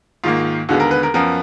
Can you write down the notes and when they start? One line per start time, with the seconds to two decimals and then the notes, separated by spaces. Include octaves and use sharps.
0.24 G#2 D#3 A#3 F4
0.69 D#2 D3 G#3 B3 F#4
0.80 A#4
0.91 B4
1.03 A#4
1.14 F#2 F3 B3 A#4